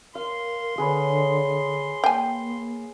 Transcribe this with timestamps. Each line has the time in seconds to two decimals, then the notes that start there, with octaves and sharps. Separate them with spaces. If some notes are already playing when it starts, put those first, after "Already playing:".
0.15 A#4 F5 C6
0.78 D3 G#4 B4 C#5
2.04 A#3 G5 G#5